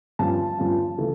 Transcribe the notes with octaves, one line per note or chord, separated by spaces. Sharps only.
G2 F3 C#4 F4 A5
G2 F3 C#4 F4
C#3 E3 A3